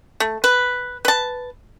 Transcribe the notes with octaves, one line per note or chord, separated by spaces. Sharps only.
A3
B4
B4 A5